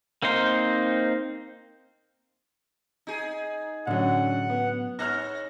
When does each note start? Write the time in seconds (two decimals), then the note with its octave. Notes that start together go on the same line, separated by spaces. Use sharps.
0.22 A#3 C4 D#4 C5
3.07 D#4 G#4
3.87 A2 D3 F#3 C#4 F#5
4.50 B3
4.99 D#4 G#4 C#5 F6 F#6 A#6